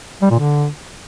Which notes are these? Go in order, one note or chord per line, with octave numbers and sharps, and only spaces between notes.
G3
A#2
D3